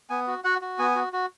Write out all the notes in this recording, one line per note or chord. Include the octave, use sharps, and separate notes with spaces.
B3 G#5
F#4
F#4 F#5
F#4
B3 G#5
F#4
F#4